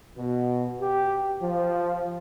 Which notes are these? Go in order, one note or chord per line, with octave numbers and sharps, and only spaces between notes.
B2
G4
F3